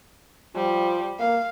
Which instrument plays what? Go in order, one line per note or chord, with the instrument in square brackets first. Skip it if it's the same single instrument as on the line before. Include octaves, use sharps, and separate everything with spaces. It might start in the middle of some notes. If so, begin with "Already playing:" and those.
[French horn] F3 [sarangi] G3
[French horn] A#3 [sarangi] F5